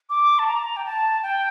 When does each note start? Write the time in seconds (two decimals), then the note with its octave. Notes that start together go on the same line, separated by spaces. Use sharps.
0.10 D6
0.39 A5
0.47 A#5
0.76 G5
0.85 A5
1.23 G5